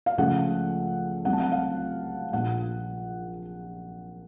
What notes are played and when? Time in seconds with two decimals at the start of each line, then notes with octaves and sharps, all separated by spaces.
0.06 F5
0.18 C#2 C#3 F3 A3 F#5
1.25 C2 C3 F#3 A3 C4 F#5
1.33 A5
1.40 F#5
1.52 F5
2.33 A#1 A#2 F3 A#3 F#5